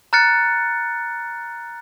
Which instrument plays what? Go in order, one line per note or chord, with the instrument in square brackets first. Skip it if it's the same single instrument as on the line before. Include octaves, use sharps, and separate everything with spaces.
[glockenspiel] A#5 F6 F#6 A6 C#7